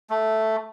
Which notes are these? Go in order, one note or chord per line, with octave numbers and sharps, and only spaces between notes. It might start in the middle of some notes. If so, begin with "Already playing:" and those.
A3